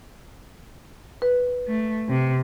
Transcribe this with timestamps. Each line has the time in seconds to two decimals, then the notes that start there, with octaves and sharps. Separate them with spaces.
1.22 B4
1.68 A3
2.08 C3